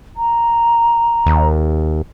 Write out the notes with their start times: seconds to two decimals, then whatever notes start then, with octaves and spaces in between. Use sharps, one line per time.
0.17 A#5
1.26 D#2